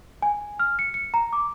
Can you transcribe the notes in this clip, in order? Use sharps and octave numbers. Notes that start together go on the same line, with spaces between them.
G#5
F6
C#7
C#7
A#5
D6